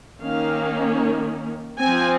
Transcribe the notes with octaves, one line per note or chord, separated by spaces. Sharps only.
D#3 A#3 C#4 F5
F3 C4 G#5